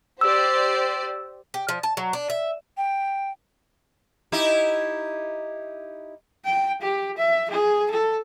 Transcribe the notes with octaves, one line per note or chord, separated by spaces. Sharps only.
G4 C5 D5 E6
G4
F3
A5
F#3
D4
E5
G5
D#4 E4 G4
G5
G4
E5
G#4
A4